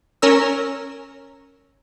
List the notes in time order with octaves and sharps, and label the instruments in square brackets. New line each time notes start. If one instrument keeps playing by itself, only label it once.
[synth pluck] C#4 A#4 E6